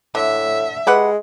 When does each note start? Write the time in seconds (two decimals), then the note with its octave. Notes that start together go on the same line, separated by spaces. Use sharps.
0.15 A2 D3 E5
0.87 G#3 G4 B4 F#5